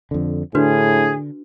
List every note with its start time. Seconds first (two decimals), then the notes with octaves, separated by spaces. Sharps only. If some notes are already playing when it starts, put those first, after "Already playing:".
0.11 F2 D3
0.55 A2 D3 D4 F#4 G#4 B4